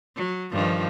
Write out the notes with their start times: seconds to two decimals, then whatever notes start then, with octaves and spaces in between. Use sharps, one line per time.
0.16 F#3
0.52 G2 D#3 F3